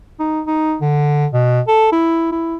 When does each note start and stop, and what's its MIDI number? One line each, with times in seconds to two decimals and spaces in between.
0.19 0.41 63
0.47 0.76 63
0.81 1.26 50
1.33 1.61 47
1.67 1.90 69
1.92 2.28 64
2.32 2.57 64